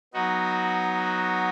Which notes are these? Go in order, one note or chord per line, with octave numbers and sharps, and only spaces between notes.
F#3 B3 D#4 F#4